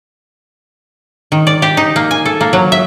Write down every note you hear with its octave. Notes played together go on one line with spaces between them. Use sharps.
D#3
D5
G4
D#4
A#3
G#5
A4
A#3
F#3
E5